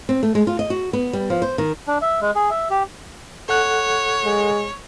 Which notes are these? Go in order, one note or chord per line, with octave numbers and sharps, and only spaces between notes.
C4
A3
G#3
F4
D#5
F#4
B3
G3
F3
C5
D#3
D4
E5
G#3
G#4
E5
G4
A4 C#5 F#5 F#6
G#3